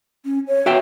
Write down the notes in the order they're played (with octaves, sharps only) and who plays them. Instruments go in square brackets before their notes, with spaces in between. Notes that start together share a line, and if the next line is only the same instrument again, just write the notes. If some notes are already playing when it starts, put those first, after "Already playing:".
[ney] C#4
C#5
[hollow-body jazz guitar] F#4 E5 G5